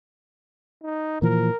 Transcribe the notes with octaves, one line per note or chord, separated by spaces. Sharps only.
D#4
A#2 E3 F3 A#4